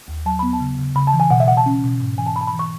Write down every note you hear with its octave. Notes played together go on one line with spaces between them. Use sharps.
D#2
F#3 A5
B3 B5
A5
C#3
C#3
C#3 B5
A5
E3
G#5
B2 F#5
E5
B2 F#5
A5
C#4
B2
G#2
E3 G#5
A5
G#2 B5
A5
B5
E3
C#6